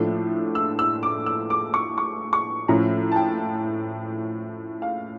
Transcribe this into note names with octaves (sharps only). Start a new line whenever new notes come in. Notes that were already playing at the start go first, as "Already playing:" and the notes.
Already playing: A2 F3 A3 D4
E6
E6
D6
E6
D6
C#6
C#6
C#6
A2 F3 C#4 A#5
A5
G5
F5